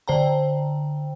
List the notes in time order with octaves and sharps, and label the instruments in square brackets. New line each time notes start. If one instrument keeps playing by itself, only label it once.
[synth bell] D3 C5 G5 A#5